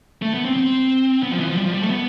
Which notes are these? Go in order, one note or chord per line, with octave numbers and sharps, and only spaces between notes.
A3
B3
C4
C4
B3
F3
E3
F3
G3
F3
G3
A3
B3